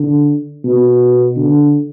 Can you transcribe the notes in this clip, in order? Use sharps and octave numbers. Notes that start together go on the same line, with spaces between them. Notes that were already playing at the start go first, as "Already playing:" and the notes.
Already playing: D3
B2
D3